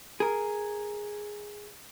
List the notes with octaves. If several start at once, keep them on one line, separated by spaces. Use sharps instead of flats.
G#4 A#4